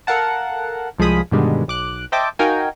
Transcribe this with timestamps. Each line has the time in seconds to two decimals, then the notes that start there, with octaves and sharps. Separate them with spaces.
0.07 A4 A#4 F5 F#5 A5
0.98 C2 F3 G#3 G#4 B5 D#6
1.31 G2 B2 D3 D#3 G3 G#3
1.68 B1 D6 F#6
2.12 C5 D#5 E5 G5 A5 D6
2.39 D#4 F#4 A#4 F5 G5 G#5